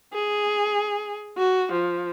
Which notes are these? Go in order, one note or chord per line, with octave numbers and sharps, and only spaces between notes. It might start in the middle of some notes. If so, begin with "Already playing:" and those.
G#4
F#4
F3